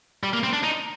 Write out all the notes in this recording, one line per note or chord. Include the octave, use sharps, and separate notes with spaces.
G3
A#3
C4
D4
D#4